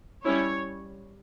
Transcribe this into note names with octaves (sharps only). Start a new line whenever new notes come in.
G3 C#4 E4 C#5